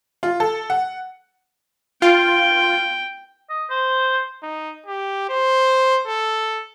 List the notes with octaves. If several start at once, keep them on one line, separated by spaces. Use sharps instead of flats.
F4
A4
F#5
F4 G5
D#5
C5
D#4
G4
C5
A4